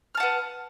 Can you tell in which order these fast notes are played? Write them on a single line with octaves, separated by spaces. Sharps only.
F6 A5 F#5 B4